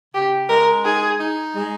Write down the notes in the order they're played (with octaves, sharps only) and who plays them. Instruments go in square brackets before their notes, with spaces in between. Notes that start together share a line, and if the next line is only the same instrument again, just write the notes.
[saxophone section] C#3 [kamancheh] G4
[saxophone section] G#3 [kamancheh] A#4
[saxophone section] D#4 [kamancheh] G#4
[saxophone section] D#4
G#3